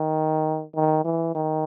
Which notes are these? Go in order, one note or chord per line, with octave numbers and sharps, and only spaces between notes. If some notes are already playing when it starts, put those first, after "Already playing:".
Already playing: D#3
D#3
E3
D#3